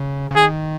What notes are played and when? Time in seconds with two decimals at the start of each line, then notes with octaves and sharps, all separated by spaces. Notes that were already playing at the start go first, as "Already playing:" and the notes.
Already playing: C#3
0.31 C#3
0.36 D#3 G#4